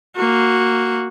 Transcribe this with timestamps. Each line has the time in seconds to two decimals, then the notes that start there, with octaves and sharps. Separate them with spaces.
0.16 A#3 F#4